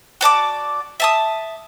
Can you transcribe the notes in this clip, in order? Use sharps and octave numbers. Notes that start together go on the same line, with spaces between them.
F#4 D5 A5 D6
E5 A5 D#6